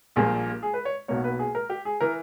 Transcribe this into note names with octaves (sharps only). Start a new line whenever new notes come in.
A#1 A#2 G3 A#3 G#4
G#4
B4
C#5
B1 B2 A#3 C#5
B4
G#4
A#4
G4
G#4
E3 A#4